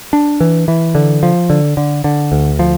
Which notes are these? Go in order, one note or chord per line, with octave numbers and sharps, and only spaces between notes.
D4
E3
E3
D3
F3
D3
D3
D3
D2
F3